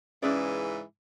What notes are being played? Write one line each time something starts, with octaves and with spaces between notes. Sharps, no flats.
G#2 C#3 E3 C#4 G#4 D5